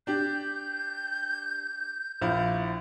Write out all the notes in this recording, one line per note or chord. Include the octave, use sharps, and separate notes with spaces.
D4 G4 G6
A#1 E4 F5